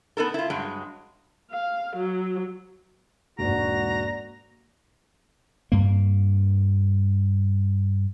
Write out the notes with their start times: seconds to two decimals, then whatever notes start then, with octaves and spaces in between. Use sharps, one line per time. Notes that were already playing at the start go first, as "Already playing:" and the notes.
0.17 B3 D#4 A4 A#4
0.34 E4 F4
0.50 G2 F#3 G#3
1.51 F5
1.96 F#3
3.39 E1 G#2 A#3 F#4 D5 A#5
5.72 G2 A#3